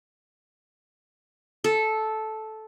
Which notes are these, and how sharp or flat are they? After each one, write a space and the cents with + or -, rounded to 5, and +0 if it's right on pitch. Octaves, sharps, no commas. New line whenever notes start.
A4 -10